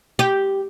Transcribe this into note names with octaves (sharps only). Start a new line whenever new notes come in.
G4